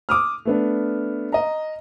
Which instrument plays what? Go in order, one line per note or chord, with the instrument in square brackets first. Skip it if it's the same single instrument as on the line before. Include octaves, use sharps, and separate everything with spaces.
[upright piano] D6 D#6 F6
A3 B3 D4
D#5 A#5